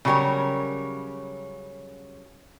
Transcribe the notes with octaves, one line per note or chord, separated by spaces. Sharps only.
C#3 F#3 G3 B3 A#4 C#5